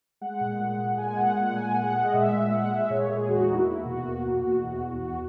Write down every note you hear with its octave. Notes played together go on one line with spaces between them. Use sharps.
G#3 F#5
A#2
G#3
A#2
G#3 G#5
A#2 F#5
A#2 F#5
G#3 G#5
G#3 F#5
G#3
D#5
A#2 E5
G#3
G#3 F#5
G#3 E5
A#2 C#5
G#3 G#4
E2 F#4
D#4
A#3
E4
E2 E4
F#4
B2
A#3
E2
B2
E2
E2
E2